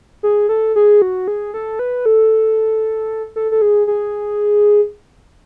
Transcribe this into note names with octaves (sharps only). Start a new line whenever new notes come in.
G#4
A4
G#4
F#4
G#4
A4
B4
A4
A4
A4
G#4
G#4